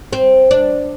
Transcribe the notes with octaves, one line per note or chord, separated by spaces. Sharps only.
C4
D4